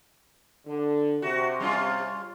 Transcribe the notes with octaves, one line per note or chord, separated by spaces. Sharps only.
D3
C3 F#4
G3 C#4 F4